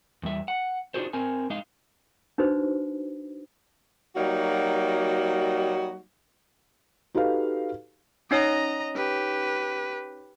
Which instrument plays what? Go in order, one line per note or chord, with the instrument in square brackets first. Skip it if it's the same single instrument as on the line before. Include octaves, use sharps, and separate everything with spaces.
[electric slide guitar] E2 G3 E5
F#5
D4 D#4 F4 F#4 G#4 C5
C4 A#4 G#5
G#3 D#4 D#5 F5
[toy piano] D4 D#4 F#4 B4 C5
[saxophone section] F#3 G3 A#3 D#4 F#4
[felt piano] D#4 F#4 G4 A4 B4 F5
[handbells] C#4 D#4 C#5 [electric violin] D#5 A#5
[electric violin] G4 B4